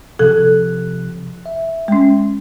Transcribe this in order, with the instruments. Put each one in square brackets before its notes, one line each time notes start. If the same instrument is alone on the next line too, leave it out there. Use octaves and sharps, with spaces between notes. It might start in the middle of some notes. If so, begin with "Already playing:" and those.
[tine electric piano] C3 F3 F#6 [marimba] A4
[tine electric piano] E5
[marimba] G#3 C#4